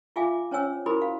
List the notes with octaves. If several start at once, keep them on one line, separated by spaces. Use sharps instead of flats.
F4 G#4 E5 F5 G#5 D6
C#4 C5 C#5 G#5 E6
E4 F#4 G#4 A#4 C5 B5
F5